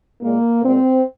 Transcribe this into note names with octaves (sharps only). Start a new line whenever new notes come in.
A#2 G#3 A#3
A#2 G#3 C4